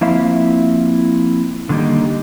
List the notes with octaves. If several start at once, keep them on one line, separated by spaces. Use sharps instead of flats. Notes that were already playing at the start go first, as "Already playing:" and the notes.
F3 A#3 C4 E4 E5 F5
D3 D#3 G3 A#3 D#4 G4